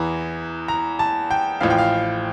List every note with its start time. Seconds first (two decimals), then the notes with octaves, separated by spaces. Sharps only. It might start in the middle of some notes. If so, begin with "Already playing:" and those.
Already playing: E2 E3 A#5
0.68 A#5
0.99 A5
1.31 G5
1.60 A1 A2 F3 F5
1.70 G5
1.78 F5